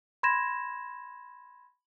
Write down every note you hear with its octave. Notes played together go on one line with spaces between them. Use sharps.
B5 C6 G#6 A#6 E7